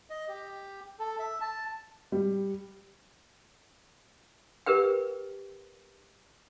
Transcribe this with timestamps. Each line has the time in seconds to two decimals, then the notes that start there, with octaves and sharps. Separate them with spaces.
0.10 D#5
0.28 G4
0.99 A4
1.19 E5
1.41 A5
2.12 G3
4.66 G4 A#4 B4 G5